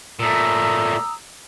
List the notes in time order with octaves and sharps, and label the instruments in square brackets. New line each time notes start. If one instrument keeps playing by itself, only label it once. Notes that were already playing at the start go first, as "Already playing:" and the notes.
[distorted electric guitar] A#2 A3 [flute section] A#5 D#6 E6